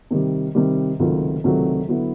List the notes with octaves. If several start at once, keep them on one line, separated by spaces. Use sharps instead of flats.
C3 D#3 G3
C3 D#3 G3
C#2 C3 D#3 F#3 A3
C#2 C3 D#3 F#3 A3
D3 F#3 B3 E4